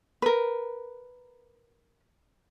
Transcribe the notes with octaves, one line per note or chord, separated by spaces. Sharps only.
A#4 B4